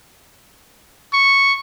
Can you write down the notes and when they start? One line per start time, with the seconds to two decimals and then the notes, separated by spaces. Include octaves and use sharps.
1.13 C#6